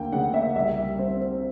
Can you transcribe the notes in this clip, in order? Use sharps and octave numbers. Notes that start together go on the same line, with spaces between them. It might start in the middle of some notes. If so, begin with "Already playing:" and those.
Already playing: D2 A#3 G5
C#3 F#5
A#3 E5
C2 E5
G3
C4
C4